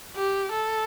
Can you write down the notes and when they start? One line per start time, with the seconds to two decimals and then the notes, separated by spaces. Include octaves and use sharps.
0.16 G4
0.52 A4